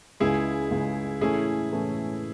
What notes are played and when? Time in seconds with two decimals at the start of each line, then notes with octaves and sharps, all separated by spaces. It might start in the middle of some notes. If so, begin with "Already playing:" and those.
0.20 C#2 C#3 G#3 E4 G#4
0.71 C#2 C#3 G#3
1.21 A2 E3 A3 C#4 E4 G#4
1.71 A2 E3 A3 C#4